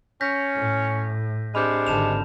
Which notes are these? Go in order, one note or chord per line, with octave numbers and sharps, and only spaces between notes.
C#4 G6 A#6 B6
A2
C3 G#3 D4 B5 F6 G6
G#1 D3 A5 E7 F7